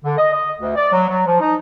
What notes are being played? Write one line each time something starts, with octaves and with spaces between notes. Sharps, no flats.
D3
D#5
D#5
D2
D5
F#3
F#3
F3
D#4